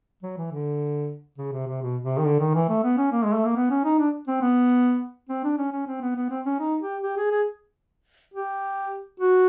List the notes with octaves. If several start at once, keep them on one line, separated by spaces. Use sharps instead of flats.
F#3
E3
D3
C#3
C3
C3
B2
C3
D#3
D3
D#3
E3
A3
B3
C#4
A#3
G#3
A3
A#3
B3
C#4
D#4
D4
C4
B3
C4
D4
C#4
C#4
C4
B3
B3
C4
C#4
D#4
G4
G4
G#4
G#4
G4
F#4